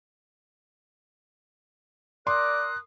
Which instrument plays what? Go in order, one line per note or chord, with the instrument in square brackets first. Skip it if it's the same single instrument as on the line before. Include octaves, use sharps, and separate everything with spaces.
[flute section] A#4 D#6 F#6 [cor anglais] D5 [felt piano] C6